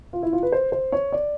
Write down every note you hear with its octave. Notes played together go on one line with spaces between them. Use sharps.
F4
E4
F4
B4
C5
C5
C#5
D5